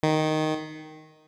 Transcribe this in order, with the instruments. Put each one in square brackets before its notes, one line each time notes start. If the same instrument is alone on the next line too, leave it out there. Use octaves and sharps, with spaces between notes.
[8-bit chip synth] D#3